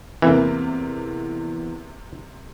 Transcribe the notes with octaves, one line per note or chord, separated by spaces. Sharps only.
E2 C3 E3 A#3